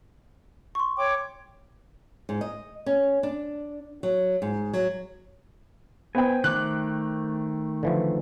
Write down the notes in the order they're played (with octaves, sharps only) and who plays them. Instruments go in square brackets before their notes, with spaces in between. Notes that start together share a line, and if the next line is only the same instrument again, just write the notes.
[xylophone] C6 C#6
[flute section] C#5 G5 D6
[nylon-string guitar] G#2
D#5
C#4
D4
F#3
G#2
F#3
[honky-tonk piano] B3 [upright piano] C5 G5 [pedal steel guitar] G#5
[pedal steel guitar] D#3 A3 D6 [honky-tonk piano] F#6
[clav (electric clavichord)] D3 E3 F3